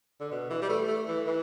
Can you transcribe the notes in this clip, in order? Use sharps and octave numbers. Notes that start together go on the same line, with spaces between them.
D3
B2
E3
G3
A3
A3
E3
E3